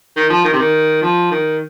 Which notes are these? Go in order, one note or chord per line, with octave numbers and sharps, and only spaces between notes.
D#3
F3
D#3
C3
D#3
F3
D#3